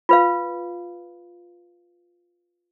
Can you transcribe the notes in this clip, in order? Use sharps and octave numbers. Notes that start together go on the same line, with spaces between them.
F4 B4 F5